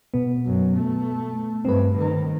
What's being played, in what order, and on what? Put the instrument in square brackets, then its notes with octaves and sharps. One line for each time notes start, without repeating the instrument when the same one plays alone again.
[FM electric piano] B2 B3
[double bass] F#2
A3
[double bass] G2 [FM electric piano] C4 B4
[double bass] D#3